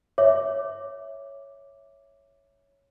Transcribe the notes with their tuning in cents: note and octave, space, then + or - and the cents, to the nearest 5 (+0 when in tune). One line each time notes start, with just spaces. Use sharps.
C#5 +0 E5 +0 D6 +0